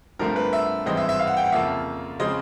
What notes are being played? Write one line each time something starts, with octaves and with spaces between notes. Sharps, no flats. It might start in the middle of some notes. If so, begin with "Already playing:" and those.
G2 D3 F3 A3 C4 A#4
B4
E5
G#1 G2 E3 G#3 C4 D#5
E5
E5
F5
F#5
G5
F#5
F2 C#3 F3 A#3 E5
C#3 F3 G#3 C4 D#5